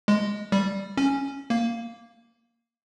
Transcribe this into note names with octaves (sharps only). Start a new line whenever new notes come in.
G#3
G3
C#4
A#3